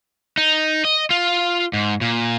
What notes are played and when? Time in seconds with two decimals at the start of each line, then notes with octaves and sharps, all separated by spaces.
0.37 D#4
0.85 D#5
1.10 F4
1.73 G#2
2.01 A#2